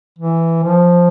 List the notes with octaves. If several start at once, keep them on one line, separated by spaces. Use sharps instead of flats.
E3
F3